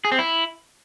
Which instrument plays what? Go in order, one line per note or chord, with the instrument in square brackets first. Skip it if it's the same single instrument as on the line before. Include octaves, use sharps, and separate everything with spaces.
[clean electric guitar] G#4
C4
E4